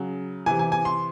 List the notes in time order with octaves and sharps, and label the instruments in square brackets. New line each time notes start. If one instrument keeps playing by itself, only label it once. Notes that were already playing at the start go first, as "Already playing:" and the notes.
Already playing: [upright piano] C#3 F#3
C3 E3 G#5
G#5
G#5
C6